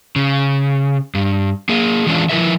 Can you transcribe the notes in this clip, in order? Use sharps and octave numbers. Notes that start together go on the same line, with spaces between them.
C#3
G2
A#3 G#4
E3 G#3 C#4 D4 F4
F3 E4 F#4 A#4 B4 E5